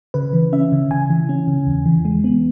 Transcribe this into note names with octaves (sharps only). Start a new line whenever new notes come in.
C#3 B4
E3
C#4 E5
C#3
C#3 G#5
E3
C#4
C#3
E2
E3
G#3
B3